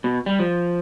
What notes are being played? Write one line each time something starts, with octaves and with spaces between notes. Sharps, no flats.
B2
G3
F3